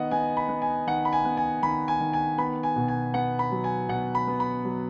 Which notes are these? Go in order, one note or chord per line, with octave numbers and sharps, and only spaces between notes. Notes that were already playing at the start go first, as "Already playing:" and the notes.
Already playing: D#3 B3 D#5 F#5
B3 G#5
B5
B3
G#5
D#3 F#5
B5
G#5
B3
G#5
D#3 B5
G#5
D#3
G#5
B3 B5
G#5
B2
G#5
B3 F#5
B5
F#3
G#5
B2 F#5
B5
B3
B5
F#3